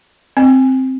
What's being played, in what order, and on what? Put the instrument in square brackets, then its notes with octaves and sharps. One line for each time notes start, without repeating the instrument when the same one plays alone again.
[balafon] C4